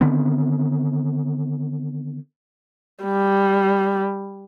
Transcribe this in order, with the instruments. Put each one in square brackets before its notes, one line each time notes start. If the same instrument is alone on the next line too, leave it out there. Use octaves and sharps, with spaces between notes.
[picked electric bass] D3 D#3 B3 C4
[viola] G3